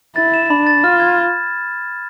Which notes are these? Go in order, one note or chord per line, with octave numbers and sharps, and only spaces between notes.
E4 A6
E7
D4 B5
A6
F4 F6
G#6